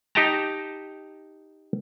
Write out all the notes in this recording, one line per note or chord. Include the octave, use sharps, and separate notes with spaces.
D#4 G4 D#5 G5 A5 A#5